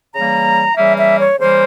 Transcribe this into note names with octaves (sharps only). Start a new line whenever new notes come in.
C#3 E3 G3 A#3 A#5
C#3 E3 G3 A#3 E5
E5
C#5
C#3 E3 G3 A#3 C5